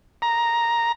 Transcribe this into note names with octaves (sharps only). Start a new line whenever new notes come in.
A#5